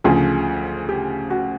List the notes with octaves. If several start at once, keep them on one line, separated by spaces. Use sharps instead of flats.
D2 C#3 F3 G#4
G4
F#4